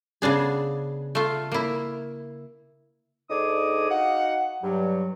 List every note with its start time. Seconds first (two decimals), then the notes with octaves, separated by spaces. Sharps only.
0.22 C#3 B3 D4 G#4
1.15 A3 F4
1.52 A#3 E4
3.30 D2 D4 D#4 G#4 D6 D#6
3.91 D#4 F#4 F5 F#5
4.63 G2 F#3